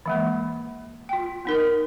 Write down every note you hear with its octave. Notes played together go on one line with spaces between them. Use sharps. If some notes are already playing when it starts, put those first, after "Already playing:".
E3 G#3 A#3
F4 G5
B3 D#4 A#4